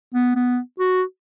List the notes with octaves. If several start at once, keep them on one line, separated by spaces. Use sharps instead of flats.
B3
B3
F#4